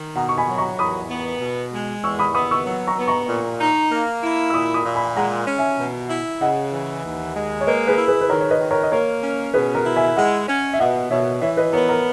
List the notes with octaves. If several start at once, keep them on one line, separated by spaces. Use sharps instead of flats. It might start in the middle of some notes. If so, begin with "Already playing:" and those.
Already playing: D#3
B2 F#5 A#5
C#6
G#5 B5
F#3
A#5 C#6
E2 B5 D#6
B3
B2
G#3
E2 C#6 E6
B5 D#6
B3 B5 D#6
C#6 E6
F#3
A#5 C#6
B3
A#5 C#6
A#2
D#4
A#3
E4
E6
A#2 B5 D#6
B5 D#6
A#2
G#5 B5
G#3 F#5 A#5
C#4
E5 G#5
B2
E4
C#3 D#5 F#5
E3
D#2
G#3
C#5
A#3 B4 D#5
G#4 B4
E4
G#4 B4
B4
D#3 A#4 C#5
C#5
B4 D#5
D#3
A#4 C#5
D#5
A#3 A#4 C#5
C#4
B2 G#4 B4
A#4
E4
E5 G#5
G#3 D#5 F#5
C#4
E5
B2 D#5 F#5
B2 C#5 E5
E3 C#5 E5
B4 D#5
B3 A#4 C#5
A#4